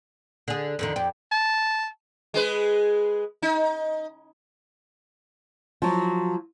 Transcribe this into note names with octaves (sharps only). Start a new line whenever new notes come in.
D3 G#4
F2 D3 D#3
F2 G4
A5
G#3 G#4 B4
D#4
F3 F#3